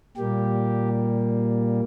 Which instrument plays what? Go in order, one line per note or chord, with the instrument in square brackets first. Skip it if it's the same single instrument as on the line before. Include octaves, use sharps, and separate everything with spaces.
[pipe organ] A#2 G3 A#3 G4